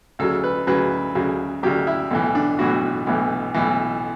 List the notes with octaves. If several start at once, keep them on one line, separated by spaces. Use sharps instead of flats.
D2 C#3 F#3 A4
B4
D2 C#3 F#3 B4
D2 C#3 F#3
D2 C#3 F#3 G4
E4
B1 A2 E3
D4
B1 A2 E3 F#4
B1 A2 E3
B1 A2 E3